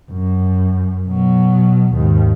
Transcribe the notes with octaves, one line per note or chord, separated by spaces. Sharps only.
F#2
B2 F#3
D#2 G#2